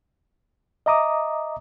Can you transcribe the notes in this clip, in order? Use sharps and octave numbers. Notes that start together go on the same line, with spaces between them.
D#5 E5 A#5 D6 D#6